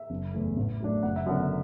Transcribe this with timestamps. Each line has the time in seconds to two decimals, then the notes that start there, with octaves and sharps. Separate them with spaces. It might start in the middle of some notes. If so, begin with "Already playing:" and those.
Already playing: E5
0.10 F#1
0.34 E2 E3 A3
0.57 A1
0.80 A2 F#3 D4
1.03 F#1 F#5
1.16 E5
1.26 F#2 D3 B3 F#5